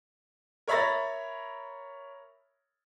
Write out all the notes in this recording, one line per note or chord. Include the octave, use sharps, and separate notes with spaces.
A#4 C#5 E5 B5 A6 A#6